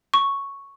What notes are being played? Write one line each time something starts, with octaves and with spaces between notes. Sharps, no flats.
C#6